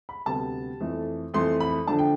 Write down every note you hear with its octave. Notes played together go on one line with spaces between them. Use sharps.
B5
D2 C3 G3 B3 A5
F2 E3 A3
F2 E3 A3 C6
B5
D3 F3 A3 D4 A5
G5